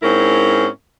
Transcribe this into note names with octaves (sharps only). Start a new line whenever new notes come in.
G#2 C4 C#4 E4 A#4